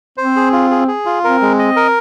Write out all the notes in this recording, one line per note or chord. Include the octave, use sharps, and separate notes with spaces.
C4 C5
G#4
F4
G#4
G#4
F4
C4 A#4
G#3
D#5
A#4